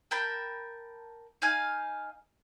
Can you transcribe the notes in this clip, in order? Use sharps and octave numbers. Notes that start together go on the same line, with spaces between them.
A#4 G5 A5 B5
D#4 F5 G#5